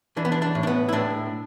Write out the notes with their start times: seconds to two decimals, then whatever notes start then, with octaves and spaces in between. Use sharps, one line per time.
0.17 E3 D4
0.25 B3
0.32 D4
0.42 D4
0.55 A2
0.63 D4
0.67 B3
0.89 E4
0.93 A2 D4